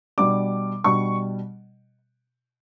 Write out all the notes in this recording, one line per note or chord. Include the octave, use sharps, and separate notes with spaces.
B2 G3 D4 D6
B2 G3 D4 C#6